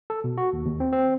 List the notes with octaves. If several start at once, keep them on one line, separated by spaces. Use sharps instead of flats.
A4
B2
F#4
D#2
D#2
C4
C4